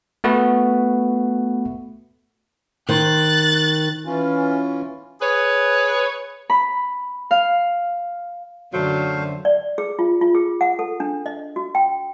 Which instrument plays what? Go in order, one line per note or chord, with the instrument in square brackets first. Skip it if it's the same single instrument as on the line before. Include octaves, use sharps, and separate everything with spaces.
[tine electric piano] A3 B3 F#4 B4
[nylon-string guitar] D#3 C5 [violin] F#6 A6
[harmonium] E3 C#4 F4
[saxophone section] G#4 B4 C#5
[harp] B5
F5
[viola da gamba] F#2 D3 [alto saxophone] F#3 [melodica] A3 C5 F5
[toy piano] D5
G#4
F4
F4
G#4
F#5
A4
D4
D#5
F#4
G5